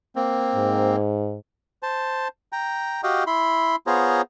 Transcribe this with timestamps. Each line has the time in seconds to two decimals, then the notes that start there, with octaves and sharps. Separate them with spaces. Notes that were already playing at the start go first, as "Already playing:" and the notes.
0.16 A#3 C4
0.55 G#2
1.83 C5 A5
2.52 G5 A#5
3.03 F#4 G4 D#5 F5 G5
3.27 E4 B5 C6
3.87 B3 F4 G#4 C5 C#5 A#5